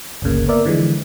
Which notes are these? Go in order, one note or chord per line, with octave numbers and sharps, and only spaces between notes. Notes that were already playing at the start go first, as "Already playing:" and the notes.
G1 D2 C#3 A#3
A#3 B3 A#4 D5 E5
D3 E3 F3 G#3